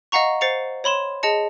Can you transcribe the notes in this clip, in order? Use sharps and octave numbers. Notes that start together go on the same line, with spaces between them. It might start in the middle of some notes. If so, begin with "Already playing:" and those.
D#5 F5 F#5 A#5 C#6
C5 A6 C7 C#7 F7
C#5 B5 C6 E7
G#4 D#5 A5 C#7